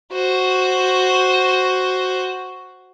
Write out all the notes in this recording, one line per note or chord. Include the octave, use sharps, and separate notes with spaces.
F#4 C5